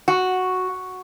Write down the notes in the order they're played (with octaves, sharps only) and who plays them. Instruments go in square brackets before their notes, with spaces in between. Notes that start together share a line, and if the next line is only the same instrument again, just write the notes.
[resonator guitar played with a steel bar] F#4